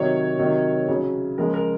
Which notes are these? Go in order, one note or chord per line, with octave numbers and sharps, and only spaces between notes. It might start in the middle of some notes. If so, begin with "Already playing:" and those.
Already playing: C3 D#3 F#3 C#5
C3 D#3 F#3
C#3 F#3
C#3 F3 G#3 A#4
A#4